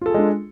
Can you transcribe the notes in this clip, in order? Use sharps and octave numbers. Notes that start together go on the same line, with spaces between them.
G#3 D4 F4 G#4 A4